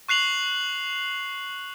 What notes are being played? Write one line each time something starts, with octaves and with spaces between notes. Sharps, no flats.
C#6 F#6 C7 F7 F#7